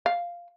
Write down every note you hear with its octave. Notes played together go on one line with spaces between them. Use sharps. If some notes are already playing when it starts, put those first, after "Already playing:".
F5